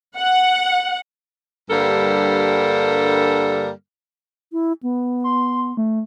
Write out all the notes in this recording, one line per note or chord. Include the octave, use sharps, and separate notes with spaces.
F#5
G2 D3 G3 A#3 A4 A#4
E4
B3
C6
A3